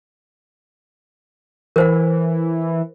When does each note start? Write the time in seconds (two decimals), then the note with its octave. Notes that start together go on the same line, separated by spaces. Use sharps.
1.76 E3 A#4 C5 F#5